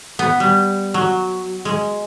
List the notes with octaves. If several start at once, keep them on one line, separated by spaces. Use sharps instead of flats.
B3
G3
F#3
G#3